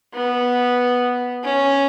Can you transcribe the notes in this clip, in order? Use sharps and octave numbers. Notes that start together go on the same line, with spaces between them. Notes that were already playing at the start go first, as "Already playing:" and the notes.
B3
C#4